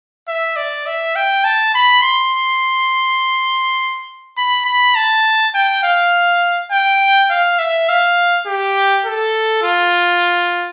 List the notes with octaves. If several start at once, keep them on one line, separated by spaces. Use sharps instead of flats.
E5
D5
E5
G5
A5
B5
C6
B5
B5
A5
G5
F5
G5
F5
E5
F5
G4
A4
F4